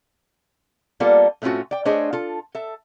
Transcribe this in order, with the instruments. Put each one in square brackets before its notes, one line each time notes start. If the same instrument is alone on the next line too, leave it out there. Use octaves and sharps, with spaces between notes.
[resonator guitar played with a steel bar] G3 A#3 B3 F4 A4 D5
A2 A3 C4 C#4 F4 F#4
D5 G5
A3 D4 G#4 C5 C#5 D#5
F4 A4
A4 E5